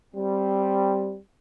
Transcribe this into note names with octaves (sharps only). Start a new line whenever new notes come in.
G3 C4